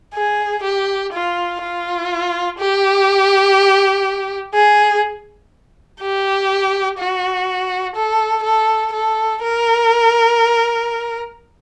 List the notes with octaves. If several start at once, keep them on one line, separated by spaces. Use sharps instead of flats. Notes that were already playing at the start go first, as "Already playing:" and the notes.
G#4
G4
F4
F4
G4
G#4
G4
F#4
A4
A4
A4
A#4